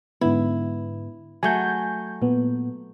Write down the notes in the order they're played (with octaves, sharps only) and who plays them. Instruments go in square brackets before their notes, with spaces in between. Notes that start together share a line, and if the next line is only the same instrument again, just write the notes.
[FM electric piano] G#2 D3 B3 [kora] E4
[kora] F#3 A3 [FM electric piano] G#5 G6
[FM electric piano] A#2 B3